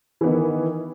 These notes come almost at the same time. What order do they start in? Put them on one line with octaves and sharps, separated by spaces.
E3 B3 D#4 D#3